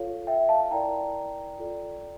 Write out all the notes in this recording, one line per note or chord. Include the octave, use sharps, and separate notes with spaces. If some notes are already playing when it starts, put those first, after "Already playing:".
Already playing: F4 A4 C#5 F5
E5 G5
F5 A5
E4 A#4 D5 G5 A#5
F4 A4 D5